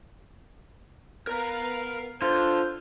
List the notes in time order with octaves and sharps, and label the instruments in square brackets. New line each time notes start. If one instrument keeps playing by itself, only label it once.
[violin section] B3 B4 F5 [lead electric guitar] A#4 A#5
[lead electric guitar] D3 [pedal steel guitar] F4 [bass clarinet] C5 [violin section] G6